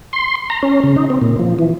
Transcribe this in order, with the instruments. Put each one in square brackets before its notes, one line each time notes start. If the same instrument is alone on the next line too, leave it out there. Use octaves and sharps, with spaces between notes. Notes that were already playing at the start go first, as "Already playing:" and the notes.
[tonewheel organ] C6
A#5
C#4
C#3
D#4
C4
A#2
F3
E3